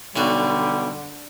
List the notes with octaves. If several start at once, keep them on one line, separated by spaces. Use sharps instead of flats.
B1 B2 D3 G3 F#4